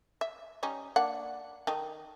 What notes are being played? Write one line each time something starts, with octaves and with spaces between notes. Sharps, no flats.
E5
G3 C#4 D#4
A#3 D4 F#5
D#3 D#4 A4